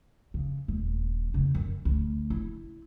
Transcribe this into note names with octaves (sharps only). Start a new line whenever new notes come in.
C#3
D#1
F2 C#3
F#2
D2
E4